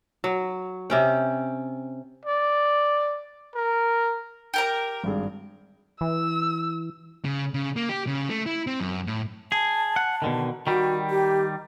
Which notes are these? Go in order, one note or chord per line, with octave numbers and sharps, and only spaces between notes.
F#3
C3 C#4 G5
D5
A#4
G4 A#4 A#5
G#1 G2 G#4
E3 E6
C#3
C#3
A#3
G4
C#3
A3
E4
C4
F#2
A2
G#4 A5
F#5
B2 D3 D#3
D#3 G3 F#4
G4